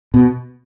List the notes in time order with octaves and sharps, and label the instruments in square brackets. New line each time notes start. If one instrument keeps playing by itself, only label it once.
[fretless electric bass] B2